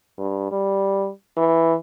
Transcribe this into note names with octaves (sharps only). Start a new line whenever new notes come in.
G2
G3
E3